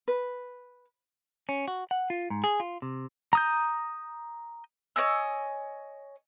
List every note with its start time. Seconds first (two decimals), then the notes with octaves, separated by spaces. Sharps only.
0.08 B4
1.49 C#4
1.68 F#4
1.91 F#5
2.10 F4
2.30 G#2
2.44 G#4
2.60 F4
2.82 C3
3.33 A#5 D#6 G6
4.96 C#5 D#5 G#5 E6